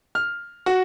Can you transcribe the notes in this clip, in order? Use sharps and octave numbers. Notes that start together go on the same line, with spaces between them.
F6
F#4